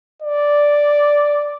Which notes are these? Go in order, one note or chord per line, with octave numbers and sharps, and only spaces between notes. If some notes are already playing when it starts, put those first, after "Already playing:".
D5